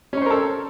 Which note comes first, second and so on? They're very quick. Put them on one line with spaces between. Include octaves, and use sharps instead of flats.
C#4 C#5 C5 A#4 A4